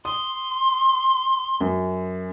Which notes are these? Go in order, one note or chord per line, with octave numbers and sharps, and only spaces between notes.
C6 D#6
F#2